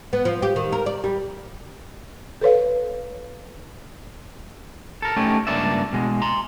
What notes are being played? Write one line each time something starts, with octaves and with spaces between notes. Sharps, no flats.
B3
F3
G4
D#3
A#4
D5
G3
A4 B4 C#5 F5
A4 A#4
A3 C#4 D#4 G4
C#2 G2 A#3 D4 D5 E5
B2 G#3
A#5 C6